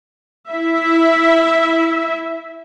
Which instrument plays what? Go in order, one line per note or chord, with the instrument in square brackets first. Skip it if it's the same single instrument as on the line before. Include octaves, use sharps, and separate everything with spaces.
[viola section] E4 E5